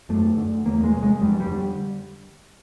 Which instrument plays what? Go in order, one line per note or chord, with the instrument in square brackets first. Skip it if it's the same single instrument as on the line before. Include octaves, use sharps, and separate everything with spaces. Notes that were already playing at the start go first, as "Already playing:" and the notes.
[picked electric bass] F#2 A3
D3
E2 A#3
G#3
C3
G#3
F2 G3
G3
D3